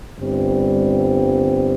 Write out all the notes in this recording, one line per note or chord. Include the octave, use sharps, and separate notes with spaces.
G1 G2 G3 C4